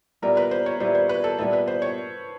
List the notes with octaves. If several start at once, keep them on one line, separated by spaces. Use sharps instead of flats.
A#2 G3 B3 E4 A#4
B4
C5
C#5
A#2 G3 B3 E4 C5
C5
B4
A4
A#2 G3 B3 E4 A4
B4
C5
C#5